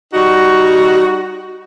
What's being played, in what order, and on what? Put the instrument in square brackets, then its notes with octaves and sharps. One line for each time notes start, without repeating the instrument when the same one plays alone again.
[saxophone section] G3 D#4 F#4